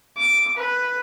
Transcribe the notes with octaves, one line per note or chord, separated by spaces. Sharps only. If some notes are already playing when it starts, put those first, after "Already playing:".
D6
B4